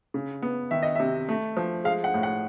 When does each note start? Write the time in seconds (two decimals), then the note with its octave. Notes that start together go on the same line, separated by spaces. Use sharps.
0.14 C#3
0.42 B3
0.71 D#3 E5
0.83 D#5
0.95 C3 E5
1.29 A3
1.57 F3
1.84 G#3 F5
2.04 F#5
2.14 A2
2.23 F#5